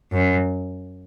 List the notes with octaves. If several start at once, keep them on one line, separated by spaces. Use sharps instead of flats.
F#2